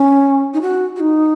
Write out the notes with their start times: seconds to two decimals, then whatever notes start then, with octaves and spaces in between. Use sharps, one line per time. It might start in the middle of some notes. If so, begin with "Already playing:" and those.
Already playing: C#4
0.54 D#4
0.61 F#4
0.96 F#4
1.00 D#4